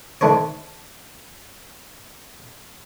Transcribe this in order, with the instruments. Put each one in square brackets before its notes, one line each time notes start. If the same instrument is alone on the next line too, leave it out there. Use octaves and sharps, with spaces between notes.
[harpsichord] D3 D#3 A3 D4 C5 C#5